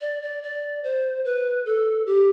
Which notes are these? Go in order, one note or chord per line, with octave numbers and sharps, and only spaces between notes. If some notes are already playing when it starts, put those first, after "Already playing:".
D5
D5
D5
C5
B4
A4
G4